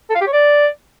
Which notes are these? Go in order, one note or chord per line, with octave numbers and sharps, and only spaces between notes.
A4
F5
G4
C#5
D5